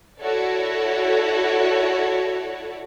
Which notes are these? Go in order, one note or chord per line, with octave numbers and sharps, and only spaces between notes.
E4 F#4 A4 C#5 D5